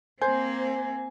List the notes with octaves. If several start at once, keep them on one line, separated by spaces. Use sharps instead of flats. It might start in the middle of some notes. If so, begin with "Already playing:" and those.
A#3 C4 C5 G#5